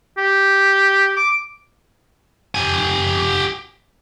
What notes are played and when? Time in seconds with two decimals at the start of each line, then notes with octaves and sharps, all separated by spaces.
0.18 G4
1.16 D6
2.55 G4 G#5